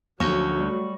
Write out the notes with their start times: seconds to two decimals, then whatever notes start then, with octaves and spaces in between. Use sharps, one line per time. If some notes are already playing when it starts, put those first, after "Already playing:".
0.20 D2 F3 F#3 A3 A#3 C#4 C#6 A#6
0.60 G3